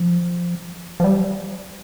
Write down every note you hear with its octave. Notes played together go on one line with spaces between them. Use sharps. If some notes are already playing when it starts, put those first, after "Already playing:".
Already playing: F3
F3
G3